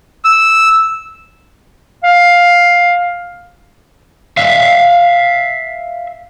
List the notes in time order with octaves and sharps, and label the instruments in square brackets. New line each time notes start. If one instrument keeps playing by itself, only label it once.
[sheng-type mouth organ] E6
[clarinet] F5
[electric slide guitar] E5 F5